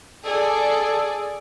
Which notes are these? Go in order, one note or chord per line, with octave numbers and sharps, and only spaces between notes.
G#4 A4 D5